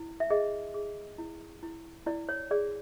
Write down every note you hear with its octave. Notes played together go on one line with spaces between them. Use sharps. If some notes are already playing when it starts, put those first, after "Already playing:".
Already playing: E4
E5
G#4 D#5
G#4
E4
E4
E4 D5
C#5
G#4 D5